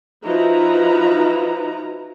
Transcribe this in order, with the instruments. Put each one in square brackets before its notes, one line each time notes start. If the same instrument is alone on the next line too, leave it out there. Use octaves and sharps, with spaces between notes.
[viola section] F3 D#4 E4 F#4 B4 A#5